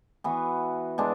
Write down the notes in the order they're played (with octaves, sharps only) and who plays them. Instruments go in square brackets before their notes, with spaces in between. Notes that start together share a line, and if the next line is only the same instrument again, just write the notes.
[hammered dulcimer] E3 B3 F#4
B2 G#3 D4